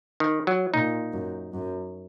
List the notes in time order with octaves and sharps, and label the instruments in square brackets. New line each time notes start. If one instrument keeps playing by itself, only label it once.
[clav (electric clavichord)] D#3
F#3
[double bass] A#2 [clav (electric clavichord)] D#4
[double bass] F#2
F#2